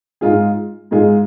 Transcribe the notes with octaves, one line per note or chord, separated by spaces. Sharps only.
G#2 G#3 F4 G#4
G#2 G#3 F4 G#4